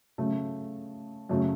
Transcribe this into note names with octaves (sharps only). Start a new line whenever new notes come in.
C#3 F#3 A3
F#2 C#3 F#3 A3